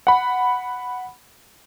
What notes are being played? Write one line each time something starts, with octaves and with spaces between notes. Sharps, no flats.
F#5 B5